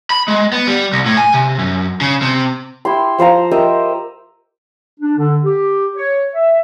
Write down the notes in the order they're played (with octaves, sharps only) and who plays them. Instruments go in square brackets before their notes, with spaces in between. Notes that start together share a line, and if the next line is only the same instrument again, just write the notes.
[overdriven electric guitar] B5
G#3
B3
G3
C2
A2
G#5
C3
F#2
C#3
C3
[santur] E4 G4 C6
F3 C5 F5 A#5
G4 A#4 D#5 E5
[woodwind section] D4
D3
G4
C#5
E5